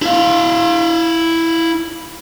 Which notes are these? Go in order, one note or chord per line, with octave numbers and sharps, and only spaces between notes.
E4 F5